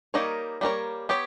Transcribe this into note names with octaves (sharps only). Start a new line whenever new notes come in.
G3 A#3 D#4 A#4 C#5
G3 A#3 D#4 A#4 C#5
B3 G4 C#5